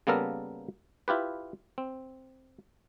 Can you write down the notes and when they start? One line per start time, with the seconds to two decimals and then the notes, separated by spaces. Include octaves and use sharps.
0.07 C#3 G3 A#3 B3 A4 A#4
1.08 E4 F4 G4 B4
1.78 C4